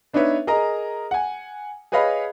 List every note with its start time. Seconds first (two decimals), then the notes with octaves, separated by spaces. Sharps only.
0.13 B3 D4 D#4 B4 C#5 E5
0.47 G#4 A#4 D#5 A#5
1.11 F#5 G#5
1.92 G#4 B4 C#5 D#5 F5 B5